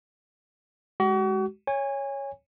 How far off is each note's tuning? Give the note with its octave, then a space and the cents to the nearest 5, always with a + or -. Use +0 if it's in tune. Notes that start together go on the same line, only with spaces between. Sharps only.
G#3 +0 F#4 +40
C#5 +0 G#5 -25